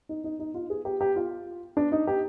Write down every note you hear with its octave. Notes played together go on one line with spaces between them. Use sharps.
D#4
D#4
D#4
F4
G#4
G4
G4
F4
D4
D#4
G4